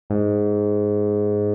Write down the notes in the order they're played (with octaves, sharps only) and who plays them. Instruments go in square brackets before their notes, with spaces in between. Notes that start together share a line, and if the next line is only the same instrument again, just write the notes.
[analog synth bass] G#2